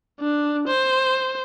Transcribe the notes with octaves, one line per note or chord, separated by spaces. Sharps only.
D4
C5